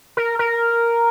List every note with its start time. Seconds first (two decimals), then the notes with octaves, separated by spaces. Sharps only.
0.17 A#4
0.39 A#4